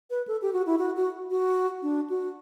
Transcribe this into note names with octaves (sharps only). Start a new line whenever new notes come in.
B4
A4
G4
F#4
E4
F#4
F#4
F#4
D4
F#4